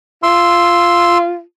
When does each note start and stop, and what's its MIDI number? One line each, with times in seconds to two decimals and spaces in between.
0.23 1.41 65
0.23 1.18 84
0.23 1.18 88